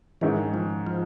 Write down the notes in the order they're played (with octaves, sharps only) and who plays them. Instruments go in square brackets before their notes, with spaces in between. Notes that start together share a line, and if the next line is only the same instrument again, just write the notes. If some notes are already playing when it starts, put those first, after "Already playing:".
[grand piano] G#2 D#3 G#3 C#4 [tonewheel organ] E3
[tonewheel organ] F3
F3